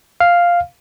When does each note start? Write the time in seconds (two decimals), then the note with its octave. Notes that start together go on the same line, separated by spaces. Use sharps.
0.20 F5